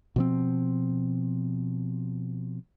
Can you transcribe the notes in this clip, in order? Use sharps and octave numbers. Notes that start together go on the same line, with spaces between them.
B2 F3 C4